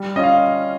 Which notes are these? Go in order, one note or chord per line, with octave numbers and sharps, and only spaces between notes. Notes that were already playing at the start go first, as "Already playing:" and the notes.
Already playing: G3
C#4 F4 D#5
F5